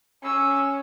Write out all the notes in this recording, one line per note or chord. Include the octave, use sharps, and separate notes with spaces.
C#4 E6